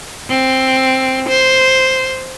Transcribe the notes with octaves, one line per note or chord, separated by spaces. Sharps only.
C4
C5